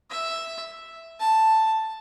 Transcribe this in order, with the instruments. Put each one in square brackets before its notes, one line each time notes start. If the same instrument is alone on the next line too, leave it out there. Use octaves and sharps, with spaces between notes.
[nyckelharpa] E5
A5